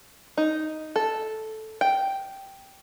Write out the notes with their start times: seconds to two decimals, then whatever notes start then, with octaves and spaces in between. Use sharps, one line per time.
0.37 D#4
0.96 A4
1.81 G5